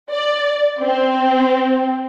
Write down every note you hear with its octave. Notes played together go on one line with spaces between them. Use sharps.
D5
C4